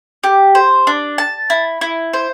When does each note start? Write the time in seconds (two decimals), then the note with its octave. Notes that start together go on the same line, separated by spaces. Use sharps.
0.24 G4
0.55 C5
0.87 D4
1.18 A5
1.50 E4
1.81 E4
2.13 C5